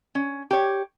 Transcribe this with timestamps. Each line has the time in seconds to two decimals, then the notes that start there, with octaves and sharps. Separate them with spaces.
0.15 C#4
0.51 G4 C#5